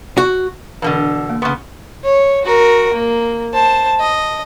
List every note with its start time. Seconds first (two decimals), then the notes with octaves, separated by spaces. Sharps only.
0.18 F#4
0.82 G2 B2 D3 E3 F5 A5
1.29 A#3
1.42 C#3 B3 C6 C#6
2.04 C#5
2.43 F#4 A#4
2.93 A#3
3.53 C5 A5
4.00 D#5